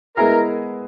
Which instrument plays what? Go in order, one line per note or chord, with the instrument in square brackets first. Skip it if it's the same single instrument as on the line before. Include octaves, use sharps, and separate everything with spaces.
[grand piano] G#3 B3 E4 G#4 [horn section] A#4